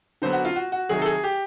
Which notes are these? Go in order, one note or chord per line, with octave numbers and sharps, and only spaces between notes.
D3 F#3 B3 C5
F#4
F4
F#4
F#4
C3 D#3 F#3 G#4
A4
G#4
G4